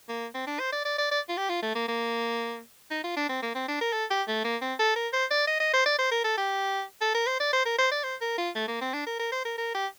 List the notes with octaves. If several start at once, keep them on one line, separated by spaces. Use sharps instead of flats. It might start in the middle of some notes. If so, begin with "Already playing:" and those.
A#3
C4
D4
C5
D5
D5
D5
D5
F4
G4
F4
A3
A#3
A#3
D#4
F4
D4
C4
A#3
C4
D4
A#4
A4
G4
A3
A#3
C4
A4
A#4
C5
D5
D#5
D#5
C5
D5
C5
A#4
A4
G4
A4
A#4
C5
D5
C5
A#4
C5
D5
C5
A#4
F4
A3
A#3
C4
D4
A#4
A#4
C5
A#4
A#4
G4